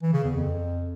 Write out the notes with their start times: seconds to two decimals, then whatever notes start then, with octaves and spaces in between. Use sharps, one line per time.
0.02 E3
0.13 C#3
0.24 E2
0.35 F2